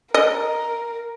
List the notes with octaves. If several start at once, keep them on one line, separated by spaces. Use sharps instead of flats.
A#4 D#5